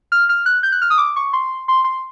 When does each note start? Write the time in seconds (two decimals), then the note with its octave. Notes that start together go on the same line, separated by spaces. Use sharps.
0.12 F6
0.29 F6
0.46 F#6
0.63 G6
0.72 F#6
0.82 F6
0.90 D#6
0.98 D6
1.16 C#6
1.33 C6
1.68 C6
1.84 C6